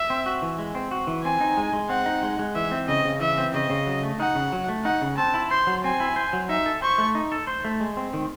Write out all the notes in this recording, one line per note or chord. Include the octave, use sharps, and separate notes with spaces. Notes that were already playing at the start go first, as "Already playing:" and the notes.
Already playing: E5
C4
F#4
E3
G#3
C4
F#4
E3
C4 G#5
D#4
G#3
G#3
C4 F#5
D#4
G#3
G#3
E3 E5
C4
C#3 D#5
C#3
E3 E5
C4
C#3 D#5
C#3
F#3
A3
D#4 F#5
C#3
F#3
A3
D#4 F#5
C#3
C4 A5
E4
C5 C6
F#3
C4 G#5
E4
C5
F#3
D#4 E5
A4
C5 C#6
A3
D#4
A4
C5
A3
G#3
C4
D#3